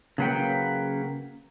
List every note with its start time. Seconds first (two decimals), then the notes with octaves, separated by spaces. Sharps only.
0.18 C#3 F#3 A#3 B4 F#5 G5